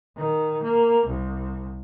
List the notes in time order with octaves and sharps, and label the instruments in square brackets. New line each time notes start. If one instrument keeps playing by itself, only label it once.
[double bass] D#3
A#3
C2